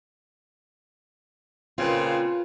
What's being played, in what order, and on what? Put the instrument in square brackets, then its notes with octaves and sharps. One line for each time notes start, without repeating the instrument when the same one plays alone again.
[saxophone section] A#2 C#3 C4 [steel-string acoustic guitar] F4 B4